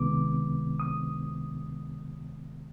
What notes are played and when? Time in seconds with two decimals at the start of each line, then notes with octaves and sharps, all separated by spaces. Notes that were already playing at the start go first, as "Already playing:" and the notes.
Already playing: C#2 C3 D#3 G#3 B3 D6
0.80 D#6